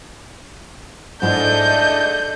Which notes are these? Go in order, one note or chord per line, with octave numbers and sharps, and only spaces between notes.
G#2 G#3 D4 E4 A4 D#5 G6